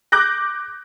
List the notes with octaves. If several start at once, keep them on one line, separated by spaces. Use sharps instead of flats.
D6 F#6 G6 A#6